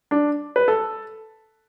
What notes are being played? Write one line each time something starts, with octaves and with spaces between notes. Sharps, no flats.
D4
B4
A4